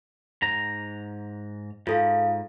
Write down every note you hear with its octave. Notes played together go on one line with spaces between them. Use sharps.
G#2 A#5
G#2 F4 A4 F5